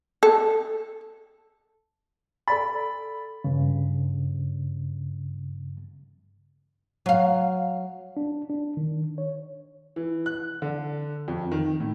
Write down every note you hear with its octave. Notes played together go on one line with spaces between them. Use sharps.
A4
A4 D5 B5 A6
G2 C#3
F#3 F5
D4
D4
D#3
C#5
E3
F#6
D3
F2
D#3
A2